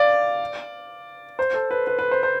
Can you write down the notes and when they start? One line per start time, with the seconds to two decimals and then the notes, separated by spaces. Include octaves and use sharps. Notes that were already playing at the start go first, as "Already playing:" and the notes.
Already playing: D5 F5
1.39 C5
1.54 A4
1.71 B4
1.87 B4
1.99 B4
2.11 C5
2.23 C5